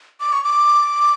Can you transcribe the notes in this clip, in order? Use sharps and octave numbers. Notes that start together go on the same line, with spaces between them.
D6
C#6
D6